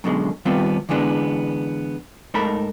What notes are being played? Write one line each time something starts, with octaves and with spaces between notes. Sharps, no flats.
F#2 B2 D3 G#3
D#3 G3 B3 C4 F4
D3 E3 G#3 B3 D4
G#2 A3 D#4 A4 A#4 B5